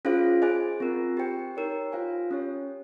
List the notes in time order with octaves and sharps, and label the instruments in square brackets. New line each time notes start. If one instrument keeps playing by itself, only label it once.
[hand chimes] C#4 F4 G#4 C5 F5
G#4 C5 D#5 G#5
C4 F4 A#4
G4 C5 G5
D#4 A#4 C#5 G5
F4 C5 F5 G#5
C#4 G4 C#5